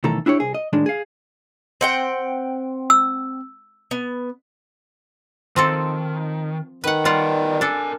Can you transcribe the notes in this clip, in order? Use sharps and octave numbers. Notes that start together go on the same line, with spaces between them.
B1 D#3 E3 A3 A4 A#5
D4 E4 G4 C#5
C2 G#4
D#5
A2 D#3 G#3 D4
G#4 F5
C4 F#5 G5
E6
B3
D#3 F3 C4 A4
D#3 B4 F#5
G3 B3 F4 D5 F#5
D4 A4 A#4 G#5